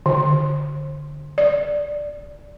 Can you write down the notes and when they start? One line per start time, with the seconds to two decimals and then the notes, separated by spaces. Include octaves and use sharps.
0.06 D3
1.38 D5